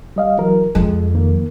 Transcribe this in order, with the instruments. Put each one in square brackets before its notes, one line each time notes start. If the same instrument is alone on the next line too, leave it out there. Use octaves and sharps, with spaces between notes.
[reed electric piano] G3 D#5 F5
E3 F#3 A#4
[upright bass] F2 [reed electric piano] G#3
[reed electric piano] D#3 A#3